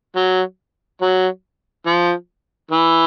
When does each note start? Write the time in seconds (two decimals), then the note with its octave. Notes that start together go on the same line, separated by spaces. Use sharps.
0.16 F#3
1.01 F#3
1.86 F3
2.71 E3